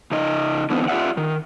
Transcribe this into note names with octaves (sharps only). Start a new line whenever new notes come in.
C#3 D#4 D#5
D3 E3 B3 C4 D#4
F4 G4 D5 E5 F#5
D#3